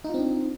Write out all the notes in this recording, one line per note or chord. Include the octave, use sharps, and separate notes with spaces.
C4 D4 D#4 F4